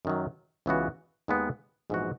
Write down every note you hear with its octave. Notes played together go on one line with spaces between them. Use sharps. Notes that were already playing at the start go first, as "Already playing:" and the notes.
F#2 D#3 F#3
C#2 C#3 E3 B3 F#4
D#2 D#3 G#3 B3
A#1 G#2 E3 B3 F#4